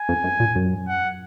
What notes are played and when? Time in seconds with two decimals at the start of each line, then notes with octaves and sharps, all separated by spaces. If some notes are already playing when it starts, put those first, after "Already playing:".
Already playing: G#5
0.09 F2
0.24 F#2
0.40 A#2
0.55 F#2
0.88 F#5